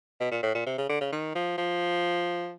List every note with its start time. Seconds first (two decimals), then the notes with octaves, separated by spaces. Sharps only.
0.20 B2
0.31 A#2
0.43 A2
0.55 A#2
0.66 C3
0.78 C#3
0.89 D3
1.01 C#3
1.12 D#3
1.35 F3
1.58 F3